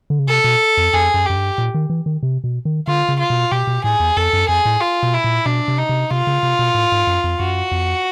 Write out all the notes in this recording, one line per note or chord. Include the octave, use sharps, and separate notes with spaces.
D3
C#3
C3 A4
B2
F2
F2 G#4
F#2
F#2 G4
G2
A#2
D#3
E3
D#3
C3
B2
D#3
D3 F4
C#3
F4
B2
B2 G4
B2
A2 G#4
E2
F2 A4
F#2
F2 G#4
A2
F4
B2
E4
A#2
B2 D4
C3
D#4
C3
C3 F4
C#3
C3
B2
A2
G#2
F#2
F2
F#2 F#4
F2